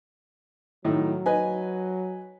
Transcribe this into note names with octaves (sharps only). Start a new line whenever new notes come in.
A2 D#3 F#3
B4 D#5 G#5